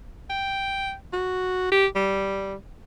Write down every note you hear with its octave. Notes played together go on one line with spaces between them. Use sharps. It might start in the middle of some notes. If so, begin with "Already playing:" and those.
G5
F#4
G4
G3